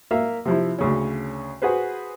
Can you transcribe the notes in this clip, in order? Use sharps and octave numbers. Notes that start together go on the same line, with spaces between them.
A#3 E5 F5
C3 F3 E4
D2 C#3 C#4
F#4 G#4 B4 C5